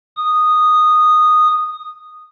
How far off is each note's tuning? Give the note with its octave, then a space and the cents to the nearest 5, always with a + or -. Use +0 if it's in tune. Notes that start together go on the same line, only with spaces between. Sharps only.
D#6 -10